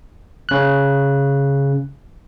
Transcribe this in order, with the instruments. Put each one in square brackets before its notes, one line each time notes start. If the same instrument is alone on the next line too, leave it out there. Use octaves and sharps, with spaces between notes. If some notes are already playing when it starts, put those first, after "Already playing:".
[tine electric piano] C#3 F#6